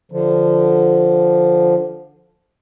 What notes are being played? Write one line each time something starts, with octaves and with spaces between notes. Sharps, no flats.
D3 F3